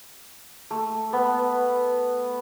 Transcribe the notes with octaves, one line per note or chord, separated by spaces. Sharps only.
A3
B3